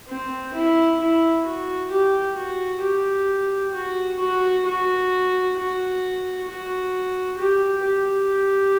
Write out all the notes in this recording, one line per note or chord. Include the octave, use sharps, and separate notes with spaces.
C4
E4
E4
F#4
G4
F#4
G4
F#4
F#4
F#4
F#4
F#4
G4
G4